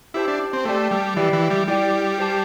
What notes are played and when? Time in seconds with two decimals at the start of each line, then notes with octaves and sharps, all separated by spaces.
0.14 E4 G4 C5 A5
0.28 D4
0.53 C4
0.65 A3 C4 G4 D5 A5
0.91 G3
1.16 E3 G4 D5 G5
1.33 E3
1.50 G3
1.67 G3 E4 G4 D5 G5
2.18 G4 C5 A5